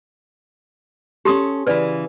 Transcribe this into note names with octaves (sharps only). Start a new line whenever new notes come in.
C#4 G4 A4 C6 D#6
C#3 E3 B4 D5